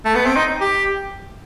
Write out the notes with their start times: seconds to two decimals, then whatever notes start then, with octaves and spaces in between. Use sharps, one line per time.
0.05 A3
0.15 B3
0.26 C4
0.36 D#4
0.61 G4